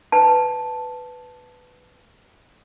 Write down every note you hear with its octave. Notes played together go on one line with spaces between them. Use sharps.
B4 A5